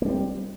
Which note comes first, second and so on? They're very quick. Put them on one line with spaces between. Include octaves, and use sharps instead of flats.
A#3 G3 C4